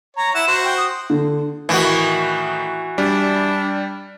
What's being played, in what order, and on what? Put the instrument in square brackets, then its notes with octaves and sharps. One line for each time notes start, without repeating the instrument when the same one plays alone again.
[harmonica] C#5 [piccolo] A#5
[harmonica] E4 F#5 [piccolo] E7
[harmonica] F#4 C5
[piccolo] G5
D#6
[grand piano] D3
[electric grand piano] A2 D#3 [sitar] E3 F#4
[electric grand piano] G3 [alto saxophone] D4